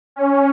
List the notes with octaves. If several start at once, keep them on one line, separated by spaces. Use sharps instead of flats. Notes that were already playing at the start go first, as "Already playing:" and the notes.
C#4